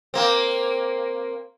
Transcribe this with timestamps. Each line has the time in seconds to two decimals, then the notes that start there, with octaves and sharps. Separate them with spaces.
0.14 A#3 C4